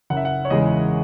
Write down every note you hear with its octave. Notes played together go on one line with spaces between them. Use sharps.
F#1 F#5
E5
F#5
C#5
E2 C#3 G#3 D#5